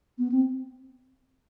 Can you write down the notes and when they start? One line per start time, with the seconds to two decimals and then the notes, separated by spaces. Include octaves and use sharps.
0.18 B3
0.32 C4